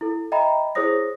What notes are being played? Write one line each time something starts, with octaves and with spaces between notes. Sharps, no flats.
E4 A4
D#5 E5 G5 A#5 B5
E4 G#4 C5 C#5 D#6 A#6